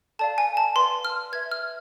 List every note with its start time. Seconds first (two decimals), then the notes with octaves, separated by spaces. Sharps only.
0.19 A4 D5 F5 A5
0.38 G#5
0.57 A5
0.76 B4 D5 F5 C6
1.05 F6
1.32 B4 E5 G#6
1.51 F6